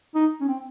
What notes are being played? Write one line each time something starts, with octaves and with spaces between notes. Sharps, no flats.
D#4
C#4
C4